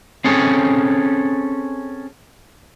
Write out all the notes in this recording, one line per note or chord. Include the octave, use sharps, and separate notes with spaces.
C4 C#4 G#4 A4